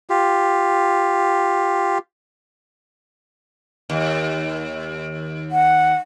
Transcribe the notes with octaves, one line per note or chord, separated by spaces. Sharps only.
F4 G4
D#2
F#5